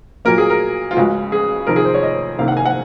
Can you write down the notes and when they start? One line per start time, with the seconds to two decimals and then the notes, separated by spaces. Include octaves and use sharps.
0.25 A#2 F#3 A#3 A#4
0.38 G#4
0.50 A#4
0.91 F4
0.97 C#2 C#3 G#3 F#4
1.32 G#4
1.67 F2 C3 D#3 A#4
1.76 G#4
1.85 C5
1.94 C#5
2.03 D#5
2.38 C2 C3 D#3 A#3 F5
2.48 F#5
2.57 G#5
2.66 F#5